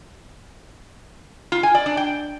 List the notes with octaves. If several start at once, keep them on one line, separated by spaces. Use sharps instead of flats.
F4
G#5
D5
D4
G5